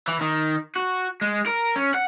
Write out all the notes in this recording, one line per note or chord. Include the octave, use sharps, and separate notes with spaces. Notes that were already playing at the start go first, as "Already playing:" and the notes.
E3
D#3
F#4
G#3
A#4
C#4
F#5